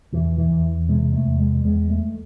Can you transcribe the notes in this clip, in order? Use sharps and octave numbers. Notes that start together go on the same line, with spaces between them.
E2 E3
E3
E2
C3 G#3
A3
E2
G#3
E2 G#3
A3